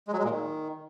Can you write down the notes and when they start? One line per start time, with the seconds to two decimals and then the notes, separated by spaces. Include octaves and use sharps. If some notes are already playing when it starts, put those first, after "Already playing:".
0.08 G#3
0.13 F#3
0.19 G#3
0.24 A#2
0.30 D#3